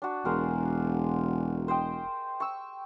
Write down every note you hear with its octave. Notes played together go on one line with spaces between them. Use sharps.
D4 F#4
E1 G#4 A#4 C5
C5 D#5 G5
C#6 E6